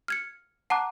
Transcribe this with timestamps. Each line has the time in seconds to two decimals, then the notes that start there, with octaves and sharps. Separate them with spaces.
0.08 F6 G#6 C#7
0.70 F#5 A5 A#5 D6 F#6